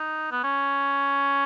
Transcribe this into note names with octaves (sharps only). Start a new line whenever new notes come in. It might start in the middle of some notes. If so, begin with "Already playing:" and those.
Already playing: D#4
B3
C#4